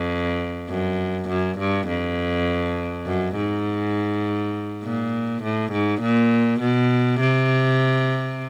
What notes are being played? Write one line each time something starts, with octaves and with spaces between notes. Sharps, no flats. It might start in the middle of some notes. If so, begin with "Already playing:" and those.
Already playing: F2
F#2
F#2
G2
F2
F#2
G#2
A#2
A2
G#2
A#2
B2
C3